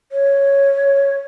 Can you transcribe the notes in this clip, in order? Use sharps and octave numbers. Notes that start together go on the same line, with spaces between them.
C#5